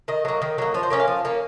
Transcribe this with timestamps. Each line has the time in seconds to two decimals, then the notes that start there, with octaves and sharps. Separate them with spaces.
0.08 D#3 D#5
0.25 F#3 A#3
0.42 D#3
0.58 F#3 A#3
0.74 F3 C#5
0.83 C5
0.90 A#3 C#4 C#5
1.00 F5
1.07 F3
1.25 A#3 C#4